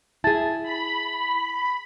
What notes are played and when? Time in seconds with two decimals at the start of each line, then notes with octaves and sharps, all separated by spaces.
0.24 E4 G#4 A5 A6
0.63 B5